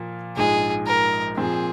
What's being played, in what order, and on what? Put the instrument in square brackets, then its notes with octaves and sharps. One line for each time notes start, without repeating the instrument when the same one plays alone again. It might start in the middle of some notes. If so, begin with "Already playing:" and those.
Already playing: [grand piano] A#2 F3 A#3 F4
[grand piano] A#1 G#2 F3 G#3 [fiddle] G#4
[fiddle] A#4
[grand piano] A#2 F3 C4 [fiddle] G#4